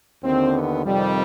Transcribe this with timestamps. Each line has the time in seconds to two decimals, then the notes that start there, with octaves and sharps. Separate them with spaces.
0.23 D#2 D3 C4
0.54 B3
0.86 F2 C3 D#3 G3